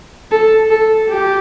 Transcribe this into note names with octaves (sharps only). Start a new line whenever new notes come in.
A4
A4
G4